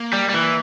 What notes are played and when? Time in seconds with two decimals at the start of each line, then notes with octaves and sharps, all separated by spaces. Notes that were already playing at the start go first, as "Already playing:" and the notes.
Already playing: A#3
0.13 G3
0.29 G3
0.34 E3